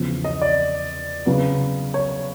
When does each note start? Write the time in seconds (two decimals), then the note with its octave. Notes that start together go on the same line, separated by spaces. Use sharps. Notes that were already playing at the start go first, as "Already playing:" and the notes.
Already playing: E2 C#3 F3
0.24 D#5
0.42 D5
1.26 C#3 F#3 B3
1.94 C#5